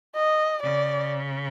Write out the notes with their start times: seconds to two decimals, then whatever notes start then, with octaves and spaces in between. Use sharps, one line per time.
0.16 D#5
0.63 C#3 D5